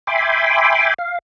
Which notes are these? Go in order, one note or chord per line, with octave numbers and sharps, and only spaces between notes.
E5 G5 G#5 B5 C6 D6
F5